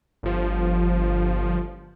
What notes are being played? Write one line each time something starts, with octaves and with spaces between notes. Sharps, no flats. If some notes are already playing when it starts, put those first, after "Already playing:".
G1 F3